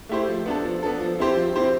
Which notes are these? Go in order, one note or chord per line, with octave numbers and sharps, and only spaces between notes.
A3 E4 G4 C5
F3
B3 D4 A4
F3
B3 D4 A4
F3
C4 E4 G4 C5
F3
C4 E4 G4 C5